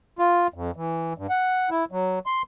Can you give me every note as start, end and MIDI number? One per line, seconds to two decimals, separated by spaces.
0.19 0.47 65
0.54 0.71 41
0.76 1.13 52
1.18 1.27 43
1.30 1.70 78
1.71 1.85 64
1.92 2.19 54
2.26 2.42 84